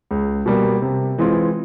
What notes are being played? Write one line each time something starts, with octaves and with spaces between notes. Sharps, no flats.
C#2
B2 G3 A#3
C3
E3 G#3 C4 F4